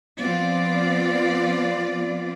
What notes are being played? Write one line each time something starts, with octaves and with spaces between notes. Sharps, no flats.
F3 B3 C4 F4 D5